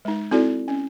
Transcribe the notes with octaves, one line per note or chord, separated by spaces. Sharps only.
G#3 D#4
C4 D#4 E4 F#4 A4 D5
C#4